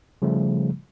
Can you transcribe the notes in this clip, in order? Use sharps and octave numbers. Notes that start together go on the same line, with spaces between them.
C#3 F3 G3 A3